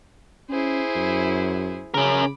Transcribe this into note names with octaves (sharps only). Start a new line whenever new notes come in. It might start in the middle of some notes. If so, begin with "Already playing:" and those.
C#4 E4 G#4 C5
F#2
C#3 C#4 A#4 B5 D6